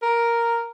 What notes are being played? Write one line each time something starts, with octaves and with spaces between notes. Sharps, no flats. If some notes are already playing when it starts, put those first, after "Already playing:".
A#4